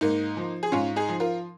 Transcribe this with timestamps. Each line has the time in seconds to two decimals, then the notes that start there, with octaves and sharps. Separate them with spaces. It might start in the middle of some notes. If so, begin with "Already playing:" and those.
0.01 G#2 A#3 D#4
0.37 F3
0.63 G#4
0.72 G#2 C#4 F4
0.96 D#4 G#4
1.09 F3
1.20 F4 A#4